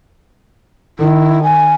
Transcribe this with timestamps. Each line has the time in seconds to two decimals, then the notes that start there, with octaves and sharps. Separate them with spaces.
0.99 D#3 E4
1.43 G#5